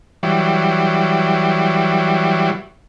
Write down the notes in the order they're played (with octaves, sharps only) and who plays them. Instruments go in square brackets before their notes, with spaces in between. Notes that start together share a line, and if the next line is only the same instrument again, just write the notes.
[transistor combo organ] E3 F#3 G3